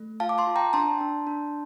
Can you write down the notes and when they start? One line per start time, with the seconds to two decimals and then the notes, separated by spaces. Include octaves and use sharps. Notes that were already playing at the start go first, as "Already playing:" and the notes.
Already playing: A3
0.20 F4 F5 A5
0.29 D6
0.38 A5 C6
0.47 F4
0.56 G5 A#5
0.73 D4 A5 C6
1.01 D4
1.27 D4